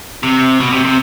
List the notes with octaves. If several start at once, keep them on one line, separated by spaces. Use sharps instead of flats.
C3
B2
C3
C3